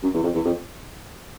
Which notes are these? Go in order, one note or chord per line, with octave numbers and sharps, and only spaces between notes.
F#2
E2
F2
E2
F2